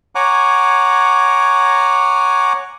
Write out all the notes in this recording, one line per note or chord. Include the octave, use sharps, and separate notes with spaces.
C#5 F#5 G#5 A#5 D6